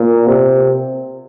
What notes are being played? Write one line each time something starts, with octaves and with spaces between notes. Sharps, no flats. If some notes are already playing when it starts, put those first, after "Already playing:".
Already playing: A#2
C3